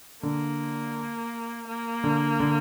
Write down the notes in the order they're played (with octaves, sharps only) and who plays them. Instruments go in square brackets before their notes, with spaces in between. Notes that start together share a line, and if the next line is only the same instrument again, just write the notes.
[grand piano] D3 [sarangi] A#3
[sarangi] A#3
[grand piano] D3
D3